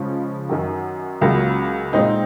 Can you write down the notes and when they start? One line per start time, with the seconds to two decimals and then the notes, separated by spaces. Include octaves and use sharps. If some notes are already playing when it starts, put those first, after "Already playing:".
Already playing: C#3 F3 G#3 C#4
0.49 F#2 D#3 F#3
1.21 C#2 C#3 F#3 A#3
1.93 A#2 G#3 C4 D#4